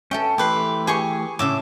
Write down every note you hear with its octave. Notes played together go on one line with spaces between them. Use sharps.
C#4 A4 E5 G5
E3 A3 G4 B4 C6
G4 G#4 G#5 C#6
A2 C#3 E5 D6